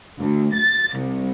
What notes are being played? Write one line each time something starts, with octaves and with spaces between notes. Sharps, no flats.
D2
A6
C2